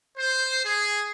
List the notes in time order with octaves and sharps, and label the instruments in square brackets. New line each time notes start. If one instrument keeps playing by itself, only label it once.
[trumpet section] C5
G#4